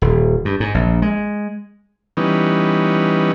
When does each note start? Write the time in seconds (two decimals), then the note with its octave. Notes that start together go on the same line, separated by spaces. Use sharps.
0.02 D#1
0.45 G2
0.60 G#2
0.74 A#1
1.02 G#3
2.17 E3 G3 B3 C#4 D#4